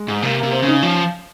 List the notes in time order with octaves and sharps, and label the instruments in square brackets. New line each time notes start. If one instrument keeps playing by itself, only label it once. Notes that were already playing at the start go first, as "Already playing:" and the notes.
Already playing: [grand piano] G#3
[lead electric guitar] G#2
[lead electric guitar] C3 [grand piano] A#3
[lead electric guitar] C3 [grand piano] A#3
[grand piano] C4
[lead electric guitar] C#3
[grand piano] D#4
[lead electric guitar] F3 [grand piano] C#4